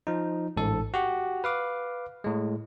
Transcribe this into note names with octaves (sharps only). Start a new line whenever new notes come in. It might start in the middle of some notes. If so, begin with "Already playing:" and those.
F3 D#4
A1 G#2 A4
F#4 G4 F#5
B4 F5 D6
A2 G#3